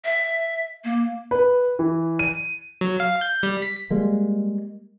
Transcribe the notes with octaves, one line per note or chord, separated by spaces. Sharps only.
E5
A#3
B4
E3
D#7
F#3
F5
G6
G3
B6
G3 G#3 A#3